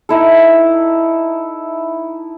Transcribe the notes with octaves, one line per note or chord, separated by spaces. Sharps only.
D#4 E4 A4